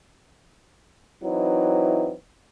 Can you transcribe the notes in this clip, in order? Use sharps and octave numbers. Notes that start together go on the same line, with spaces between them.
E3 F#3 C4 D#4 E4 B4